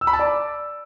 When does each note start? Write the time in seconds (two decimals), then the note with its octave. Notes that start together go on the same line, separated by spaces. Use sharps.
0.01 E6
0.07 B5
0.13 A5
0.19 D5